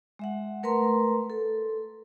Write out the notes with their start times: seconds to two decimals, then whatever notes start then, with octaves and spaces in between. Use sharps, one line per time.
0.19 G#3 E5 F#5
0.63 A3 A#4 B4 A#5 C6
1.30 A4